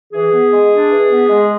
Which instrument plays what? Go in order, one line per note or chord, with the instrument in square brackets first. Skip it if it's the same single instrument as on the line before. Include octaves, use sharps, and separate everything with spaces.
[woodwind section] E3 G#4
B3
G#3
D4
E3
B3
G#3